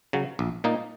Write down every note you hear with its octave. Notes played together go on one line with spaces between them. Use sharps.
C#3 F#3
A#1
A#2 A#3 D#4